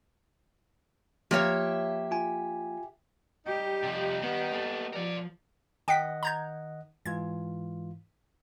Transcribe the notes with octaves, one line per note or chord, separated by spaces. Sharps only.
F3 A#3 G4 C#5 E5
F4 G#5
G3 D#4 G4
C3 F3
D#3 B3
A#3 A4
F3 A#4 D5
D#3 D#5 F#5 G5 B6
A#5 G6 G#6
G#2 E3 F4 G#6